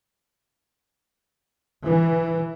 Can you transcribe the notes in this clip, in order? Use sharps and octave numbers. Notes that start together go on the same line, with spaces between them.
E3